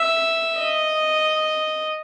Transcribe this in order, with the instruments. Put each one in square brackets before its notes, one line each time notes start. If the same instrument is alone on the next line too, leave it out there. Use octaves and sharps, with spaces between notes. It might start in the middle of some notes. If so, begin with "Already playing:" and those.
Already playing: [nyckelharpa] E5
D#5